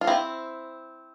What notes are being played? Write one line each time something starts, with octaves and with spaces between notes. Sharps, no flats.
F4
C4 E4